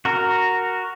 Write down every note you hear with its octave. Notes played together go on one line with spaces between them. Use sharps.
F#4 A#4